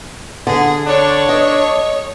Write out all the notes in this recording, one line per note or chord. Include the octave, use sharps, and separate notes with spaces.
D3 G#4
D4 C#5 C#6
D#5